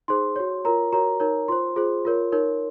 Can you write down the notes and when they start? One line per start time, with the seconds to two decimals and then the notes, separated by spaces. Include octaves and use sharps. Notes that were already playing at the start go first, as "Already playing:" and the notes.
0.08 D#4 G#4 C5 C6
0.36 F#4 C#5
0.65 F4 A#4 C#5 A#5
0.93 F#4 A#4 C#5 A#5
1.20 D#4 A#4 C#5
1.48 F4 C5 C6
1.76 F4 G#4 C5
2.05 F4 A#4 C#5
2.32 D#4 A#4 C#5